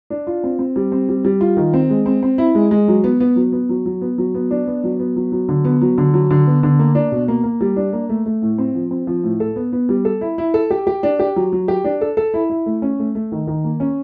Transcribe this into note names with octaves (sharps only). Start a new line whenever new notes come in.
D4
F4
C4
C4
G3
C4
G3
G3
F4
D#3
C4
G#3
C4
C4
E4
G#3
G#3
F#3
B3
B3
F#3
B3
F#3
F#3
B3
F#3
B3
D4
B3
F#3
B3
F#3
F#3
D3
B3
F#3
D3
F#3
D3
B3
D3
A#3
D4
B2
A#3
A#3
G3
D4
A#3
A3
A3
A2
C4
F3
C4
F3
A2
A4
B3
B3
G3
A4
E4
E4
A4
G4
G4
D4
G4
F#3
F#3
G4
D4
A4
A4
E4
E4
A3
C#4
A3
A3
D#3
D#3
A#3
C#4